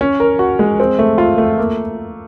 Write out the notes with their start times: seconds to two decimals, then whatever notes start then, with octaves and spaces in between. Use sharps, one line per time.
0.01 C#4
0.20 A#4
0.39 F#4
0.59 G#3
0.80 C4
0.99 A3
1.18 F4
1.38 A3
1.58 A#3